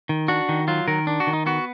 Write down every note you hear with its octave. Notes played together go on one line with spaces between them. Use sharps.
D#3
D4 F#4
D#3
F#3 F4
D#3 A#4
D4
F#4
D#3
D#4
B3 F#4